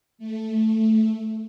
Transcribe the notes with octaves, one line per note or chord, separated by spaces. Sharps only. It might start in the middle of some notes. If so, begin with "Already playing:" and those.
A3